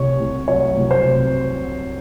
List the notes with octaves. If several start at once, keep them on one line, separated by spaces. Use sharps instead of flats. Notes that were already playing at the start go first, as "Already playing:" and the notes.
Already playing: C2 C3 C#5
C2
F#3 C#5
C2
C5
C3